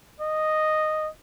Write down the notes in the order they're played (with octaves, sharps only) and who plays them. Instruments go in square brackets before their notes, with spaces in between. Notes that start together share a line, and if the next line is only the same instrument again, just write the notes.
[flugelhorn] D#5